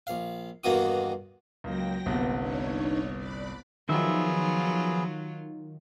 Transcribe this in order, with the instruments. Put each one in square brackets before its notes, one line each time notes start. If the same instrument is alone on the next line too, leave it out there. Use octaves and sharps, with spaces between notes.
[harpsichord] A#1 F5
E2 G2 D#3 A#3 F#4 D#6
[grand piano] C#2 A#3 [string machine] F#3 G5 A#6
[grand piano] G1 C2 [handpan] A#3 B3
[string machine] D4 D#4 C#5
D5 B5 F#6
[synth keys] D#3 [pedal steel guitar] F3 E5 [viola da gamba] F#3 F4 [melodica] B3 G#4